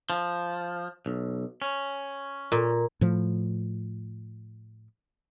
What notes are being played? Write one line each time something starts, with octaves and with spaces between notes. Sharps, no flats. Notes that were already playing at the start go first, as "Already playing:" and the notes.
F3
B1
C#4
A#2
A2 F3